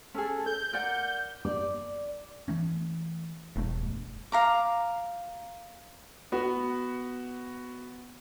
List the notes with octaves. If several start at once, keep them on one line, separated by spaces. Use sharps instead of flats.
C#4 G#4 A4
G6
A#4 D5 F#5
D5
E3 A3 C#4
E1 G2 A3
F5 A#5 D6
B3 F#4